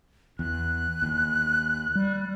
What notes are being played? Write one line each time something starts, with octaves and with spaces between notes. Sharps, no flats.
E2 F#6
D#2
G3